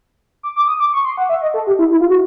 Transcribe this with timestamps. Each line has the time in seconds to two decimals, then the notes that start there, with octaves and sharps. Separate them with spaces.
0.43 D6
0.56 D6
0.68 D#6
0.80 D6
0.93 C#6
1.05 C6
1.18 F#5
1.29 E5
1.42 D#5
1.54 A4
1.67 G4
1.79 E4
1.91 E4
2.01 F4
2.10 F#4